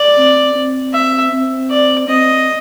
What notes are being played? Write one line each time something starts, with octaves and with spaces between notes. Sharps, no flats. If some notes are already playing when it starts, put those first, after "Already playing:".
Already playing: D5
C4
C4
E5
C4
D5
C4 D#5